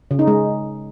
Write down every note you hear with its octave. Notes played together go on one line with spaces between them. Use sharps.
C#3
D#4
G#3